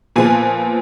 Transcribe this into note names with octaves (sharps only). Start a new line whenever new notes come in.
A#2 F3 B3 G#5